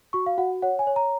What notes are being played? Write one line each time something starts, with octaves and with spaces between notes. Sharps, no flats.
F#4 C#6
F5
F#4 F#5
C#5 F#5
G#5
C#5
A#5